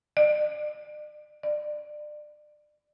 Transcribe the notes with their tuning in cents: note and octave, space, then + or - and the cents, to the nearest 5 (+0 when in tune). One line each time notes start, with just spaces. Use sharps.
D5 +40
D5 +30